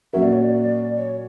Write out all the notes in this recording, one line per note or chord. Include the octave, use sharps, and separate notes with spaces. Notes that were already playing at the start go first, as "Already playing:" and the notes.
A#2 F#3 C#4 F#4 A#4 E5
D5
C#5
D5
C#5